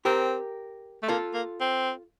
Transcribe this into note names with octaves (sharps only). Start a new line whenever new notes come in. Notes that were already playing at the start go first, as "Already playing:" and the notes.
C4 G4 A#4
A3
A#3 F4 A4
A#3
C4